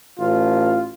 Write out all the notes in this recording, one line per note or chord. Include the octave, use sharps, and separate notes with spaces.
A1 F4